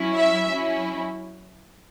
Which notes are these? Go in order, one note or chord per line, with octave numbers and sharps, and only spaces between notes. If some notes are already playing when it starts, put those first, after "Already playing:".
Already playing: F#3 C#4 E4
E5
F#3 C#4 E4